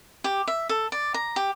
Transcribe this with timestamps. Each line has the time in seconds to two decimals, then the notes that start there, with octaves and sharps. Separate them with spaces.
0.24 G4
0.48 E5
0.69 A4
0.92 D5
1.14 A#5
1.36 G4